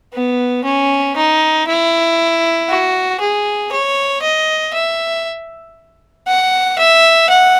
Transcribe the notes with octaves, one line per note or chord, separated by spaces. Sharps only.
B3
C#4
D#4
E4
F#4
G#4
C#5
D#5
E5
F#5
E5
F#5